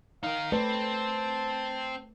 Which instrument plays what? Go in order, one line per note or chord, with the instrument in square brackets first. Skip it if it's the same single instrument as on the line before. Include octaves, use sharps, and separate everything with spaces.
[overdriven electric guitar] D#4 A#4 [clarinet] F5
[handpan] A3 B4 D5 [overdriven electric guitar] C4 [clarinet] A5